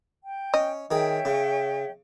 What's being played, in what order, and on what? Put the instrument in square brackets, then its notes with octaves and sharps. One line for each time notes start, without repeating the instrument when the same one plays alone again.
[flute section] G5
[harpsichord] C#4 [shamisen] D#5
[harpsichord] D#3 G#4 [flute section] C#5 E5 G5
[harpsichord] C#3